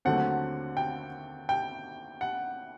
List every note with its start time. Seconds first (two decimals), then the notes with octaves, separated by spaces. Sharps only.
0.05 D#2 D3 F#3 A3 C4 F#5
0.77 G5
1.49 G5
2.21 F#5